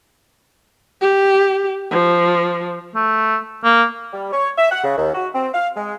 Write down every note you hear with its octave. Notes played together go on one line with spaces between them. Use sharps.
G4
F3
A3
A#3
G3
C#5
E5
F#5
C#3
D#2
F#4
C4
F5
G#3